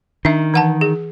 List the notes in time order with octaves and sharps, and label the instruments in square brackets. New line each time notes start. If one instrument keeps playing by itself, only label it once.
[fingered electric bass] D#3 [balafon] D4 E5
[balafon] E3 F#5 A5
G#4